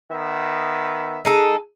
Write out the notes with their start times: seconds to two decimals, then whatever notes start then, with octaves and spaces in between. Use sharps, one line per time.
0.11 D#3 B3 E5
1.25 G#3 D#4 A4